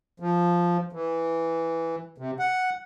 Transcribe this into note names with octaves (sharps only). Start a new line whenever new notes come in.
F3
E3
C3
F#5